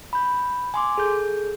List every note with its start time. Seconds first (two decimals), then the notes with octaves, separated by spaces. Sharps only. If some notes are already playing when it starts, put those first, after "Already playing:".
0.13 B5 G6
0.74 G#5 C6 D6
0.98 G#4 A4 G6